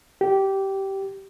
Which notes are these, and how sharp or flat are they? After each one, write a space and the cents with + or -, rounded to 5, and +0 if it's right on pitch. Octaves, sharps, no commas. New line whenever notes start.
G4 -15